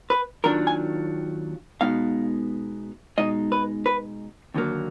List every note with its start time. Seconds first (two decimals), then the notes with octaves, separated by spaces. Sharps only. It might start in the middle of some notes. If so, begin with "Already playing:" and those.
0.10 B4
0.44 D#2 D#3 F#3 D4 F4 A#4
0.67 G#5
1.81 B2 G#3 B3 D#4 F5
3.18 B2 G#3 D#4 D#5
3.52 B4
3.86 B4
4.54 D#2 D3 F#3 A#3